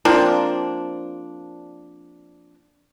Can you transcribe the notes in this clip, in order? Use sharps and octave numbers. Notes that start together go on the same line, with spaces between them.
F3 A#3 C4 D4